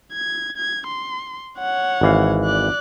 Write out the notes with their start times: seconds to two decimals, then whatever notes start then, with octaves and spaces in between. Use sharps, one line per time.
0.13 G#6
0.57 G#6
0.87 C6
1.58 C#5 F#5
2.01 G#1 E3 F5
2.45 D5 F#6